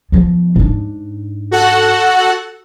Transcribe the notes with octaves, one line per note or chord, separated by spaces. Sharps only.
F3 B3
G#2 D4
F#4 A4 F#5